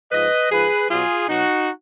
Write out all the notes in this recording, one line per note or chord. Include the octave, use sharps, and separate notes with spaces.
G#2 F3 B4 D#5
G#2 F3 G#4 B4
B2 F#3 F4 G#4
B2 F#3 D#4 F#4